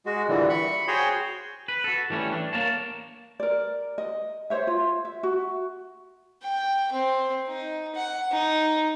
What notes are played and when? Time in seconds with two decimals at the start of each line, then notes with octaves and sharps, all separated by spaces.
0.06 G#3 F#4
0.29 A#2 D3 E3 G3
0.49 B5 C#6
0.88 F#4 G#4 C5 C#5 G5 C6
1.68 B4
1.84 F#4 A4
2.10 E3 G3 A3 C#4
2.32 D4
2.53 A#3 A#4 C#5 A5
3.40 A#4 D5
3.98 D#5
4.50 C5 C#5 E5
4.67 F4
5.05 E5
5.23 F#4
6.43 G5
6.93 C4
7.48 D#4
7.95 F#5
8.32 D#4